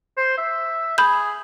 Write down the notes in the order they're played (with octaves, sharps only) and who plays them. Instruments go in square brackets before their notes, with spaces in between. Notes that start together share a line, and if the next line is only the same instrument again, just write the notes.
[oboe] C5
E5
[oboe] G#4 [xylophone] B5 G6